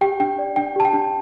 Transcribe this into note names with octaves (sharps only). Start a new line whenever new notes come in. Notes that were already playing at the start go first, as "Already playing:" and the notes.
G4 G5
D4 G5
D5
D4 G5
G4 A5
G5
D4